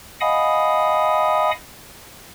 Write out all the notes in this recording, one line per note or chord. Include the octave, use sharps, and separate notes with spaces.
D#5 F5 F#5 G#5 B5 D#6